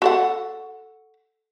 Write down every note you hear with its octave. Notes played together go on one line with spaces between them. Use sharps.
F#4 A4 F#5